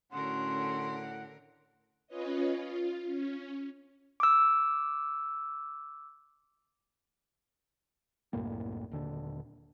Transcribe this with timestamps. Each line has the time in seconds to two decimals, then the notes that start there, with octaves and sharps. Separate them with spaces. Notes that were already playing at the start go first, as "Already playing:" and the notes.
0.12 A2 D3 C#4 F#4 A#4 F#5 C6
2.07 C#4 F4 B4 C#5 D#5
2.54 F4
3.06 C#4
4.20 D6 E6
8.33 C2 F#2 A2 A#3
8.92 D#1 D3